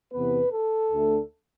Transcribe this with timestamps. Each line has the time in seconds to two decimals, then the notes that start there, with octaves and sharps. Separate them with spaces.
0.13 E2 C3 E3 B3 B4
0.51 A4
0.91 D2 D3 A3